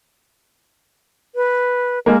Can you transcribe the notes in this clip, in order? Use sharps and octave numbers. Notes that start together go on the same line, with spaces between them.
B4
G#3 A#3 A#4